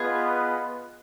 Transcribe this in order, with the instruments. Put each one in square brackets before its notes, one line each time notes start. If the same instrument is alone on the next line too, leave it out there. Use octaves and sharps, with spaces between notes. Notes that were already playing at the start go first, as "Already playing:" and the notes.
Already playing: [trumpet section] B3 F4 B4 D#5 [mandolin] G#4